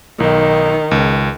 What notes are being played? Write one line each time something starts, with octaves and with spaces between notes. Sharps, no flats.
B1 D#3
C#2